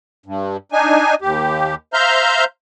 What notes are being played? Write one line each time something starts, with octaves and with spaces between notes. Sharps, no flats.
G2
D4 D#4 G#5
D#2 G4
C5 E5 F5 A#5 F6 G6